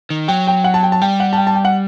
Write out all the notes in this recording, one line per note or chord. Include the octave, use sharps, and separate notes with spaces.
D#3
F#3 G5
G5
F#5
A5
G5
A5
G3 G5
F#5
A5
G5
A5
G5
F#5